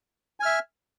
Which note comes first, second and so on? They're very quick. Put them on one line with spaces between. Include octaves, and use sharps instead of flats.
G#5 F6 E5